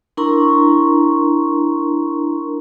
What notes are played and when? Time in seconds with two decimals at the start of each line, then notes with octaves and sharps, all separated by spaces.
0.17 D4 E4 A#4 A#5 C6 C#6